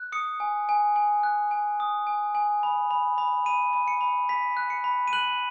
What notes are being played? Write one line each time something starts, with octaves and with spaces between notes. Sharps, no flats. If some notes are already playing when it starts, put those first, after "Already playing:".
Already playing: F#6
D#6 C#7
G#5
G#5
G#5
F#6
G#5
D#6
G#5
G#5
B5
B5
B5
B5 D#7
B5
C#7
B5
B5 B6
F#6
C#7
B5
D#7
F#6 F#7